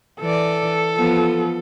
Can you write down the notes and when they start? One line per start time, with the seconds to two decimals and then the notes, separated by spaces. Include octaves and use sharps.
0.21 E3 A4 D5
0.96 F3 B3